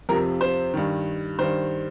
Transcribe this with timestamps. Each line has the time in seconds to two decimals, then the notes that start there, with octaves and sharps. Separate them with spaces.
0.09 F2 C3 F3 A#4
0.41 C5
0.74 G2 D#3
1.39 G2 D#3 C5